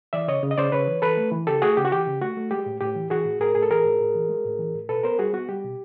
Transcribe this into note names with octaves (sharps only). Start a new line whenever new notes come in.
E3 D5 E5
C#3 C#5 D#5
C#3
D#5
C#3 C5 D5
C#3 B4 C#5
E3
E3 A4 B4
A3
E3
C#3 G4 A4
A3 F#4 G#4
C#3 G4
F#4
E3 G4
C#3
A3 F#4
A3
G#3 G4
A2
A2 G4
E3
E3 F#4 G#4
A2
A2 G#4 A#4
A2 G#4
A4
E3 G#4 A#4
A2
A2
E3
G#3
A2
E3
A2
B2 A4 B4
B3 A#4 C5
G3 F#4 G#4
B3 F#4
G3 G4
B2